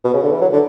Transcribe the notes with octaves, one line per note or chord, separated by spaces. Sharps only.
B2
C#3
D3
E3
F#3
D3